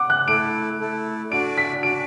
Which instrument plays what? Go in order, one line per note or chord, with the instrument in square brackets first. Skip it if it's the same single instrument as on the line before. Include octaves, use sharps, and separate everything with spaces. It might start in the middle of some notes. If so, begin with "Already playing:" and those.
Already playing: [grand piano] F#5 D6
F#6
[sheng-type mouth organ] A3 E4 A4 [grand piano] D7
[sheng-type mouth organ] A3 E4 A4
[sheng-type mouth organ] D4 F#4 D5 [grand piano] D7
[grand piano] B6
[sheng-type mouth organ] D4 F#4 D5 [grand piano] D7